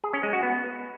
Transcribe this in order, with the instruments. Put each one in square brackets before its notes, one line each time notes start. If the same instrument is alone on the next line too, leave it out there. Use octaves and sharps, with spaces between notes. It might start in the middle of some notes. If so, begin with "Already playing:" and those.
[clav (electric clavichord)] G#4
C#4
G#3
F#4
B3